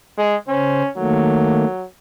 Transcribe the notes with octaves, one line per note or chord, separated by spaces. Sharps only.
G#3
C#3 C#4 C5
D#3 F#3 A3 A#3